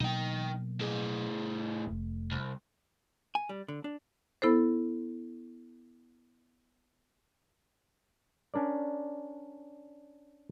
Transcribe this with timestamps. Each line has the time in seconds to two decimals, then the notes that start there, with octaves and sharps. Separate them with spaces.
0.01 B2 F#3 A#3 D#4 G5
0.81 A2 G#4
1.87 F1 A3
2.31 C2
3.35 G#5
3.49 G3
3.68 D3
3.84 D4
4.42 B3 E4 A4 C5
8.54 C#4 D4 A#4 D5